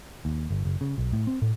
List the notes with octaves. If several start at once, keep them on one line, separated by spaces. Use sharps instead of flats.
D#2
G1
F#1
C#3
B1
A2
C4
A2